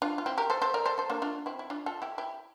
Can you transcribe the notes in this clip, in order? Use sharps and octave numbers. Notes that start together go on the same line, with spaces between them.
D4 F4
F4
C4 E4
G4 A#4
A4 C5
A4 C5
A#4 D5
A4 C5
A4 C5
A#3 D4
D4 F4
C4 E4
E4
D4 F4
F4 A4
E4 G4
E4 G4